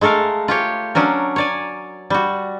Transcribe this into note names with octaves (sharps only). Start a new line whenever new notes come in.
G#3 A3 A4 A#4 F5
F4 G4 C#5
F#3 C#4 D4 A#4
C#5 D5 G#5
G3 F#4